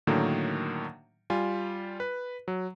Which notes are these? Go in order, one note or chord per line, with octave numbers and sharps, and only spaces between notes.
A2 D3 D#3 F#3 A#3
G3 F4 G#5
B4
F#3